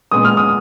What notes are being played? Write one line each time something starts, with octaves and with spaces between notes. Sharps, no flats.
A#2 G#3 B3 D#6
F6
D#6